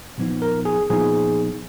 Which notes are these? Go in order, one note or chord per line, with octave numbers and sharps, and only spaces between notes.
A#2 F3 B3 D#4
A#4
G#4
A#2 F3 B3 D#4 G#4